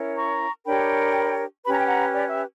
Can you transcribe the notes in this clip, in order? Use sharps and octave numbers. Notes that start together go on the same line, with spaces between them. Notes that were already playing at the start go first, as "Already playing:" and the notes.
Already playing: C#4 E4 A#4 C#5
A#5 C#6
D4 G4 A#4 C#5 G5 B5
C#4 G4 B4 B5
A#5
G5
F#5 A#5
D5
E5